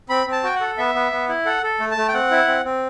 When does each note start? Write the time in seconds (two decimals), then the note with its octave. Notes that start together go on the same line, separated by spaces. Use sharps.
0.09 C4 B5
0.27 C4
0.32 A5
0.43 F#4 G5
0.55 F#5
0.61 A4
0.78 B3 E5
0.95 B3
1.12 B3
1.29 E4
1.45 A4 F#5
1.63 A4
1.80 A3
1.91 A5
1.97 A3
2.08 G5
2.14 C4 F#5
2.31 E4
2.48 C4
2.65 C4